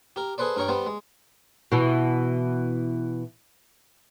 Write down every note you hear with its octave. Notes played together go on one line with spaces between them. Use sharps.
G4 A#4
G#4 A4 B4 C5 D5
G2 A#4 C#5 G5
G3 B3 G4 C5
G#3
B2 E3